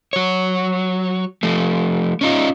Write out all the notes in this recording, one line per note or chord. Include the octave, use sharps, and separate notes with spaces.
F#3 C#5
F3 A3
C#4 D#4 F4